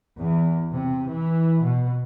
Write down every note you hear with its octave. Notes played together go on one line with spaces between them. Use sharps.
E2
C3
E3
B2